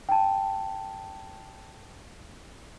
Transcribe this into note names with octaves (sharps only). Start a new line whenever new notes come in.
G5 A5